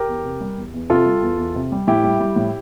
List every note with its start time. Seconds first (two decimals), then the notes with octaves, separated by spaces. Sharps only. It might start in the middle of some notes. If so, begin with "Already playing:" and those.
Already playing: G4 A#4
0.08 E2
0.25 C3
0.41 G3
0.58 E2
0.74 E2
0.90 C3 F4 A4
1.06 G3
1.22 E2
1.38 E2
1.55 C3
1.72 G3
1.87 A2 E4 G4
2.04 G3
2.20 G3
2.36 A2